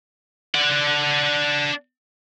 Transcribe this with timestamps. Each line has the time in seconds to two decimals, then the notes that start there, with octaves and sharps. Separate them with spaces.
0.55 D4 F#5